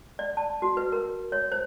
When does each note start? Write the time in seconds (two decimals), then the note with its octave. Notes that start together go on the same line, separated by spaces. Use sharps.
0.19 D5
0.37 A5
0.62 F#4
0.77 B4
0.92 A#4
1.32 C#5
1.52 C5